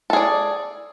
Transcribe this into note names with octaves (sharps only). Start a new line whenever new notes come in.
G#4 A4 D5